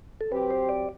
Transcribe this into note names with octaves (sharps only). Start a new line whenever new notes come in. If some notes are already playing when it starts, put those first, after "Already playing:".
A4
F#3 C4 G4 B4
C5
D5